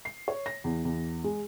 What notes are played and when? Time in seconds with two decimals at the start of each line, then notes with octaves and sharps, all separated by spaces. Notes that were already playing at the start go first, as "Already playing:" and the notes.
0.05 C7
0.28 C#5
0.46 A#6
0.64 E2
0.85 E2
1.24 G#3